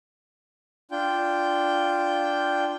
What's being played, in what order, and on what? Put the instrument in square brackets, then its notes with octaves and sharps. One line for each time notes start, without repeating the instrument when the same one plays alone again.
[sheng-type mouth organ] D4 F4 G5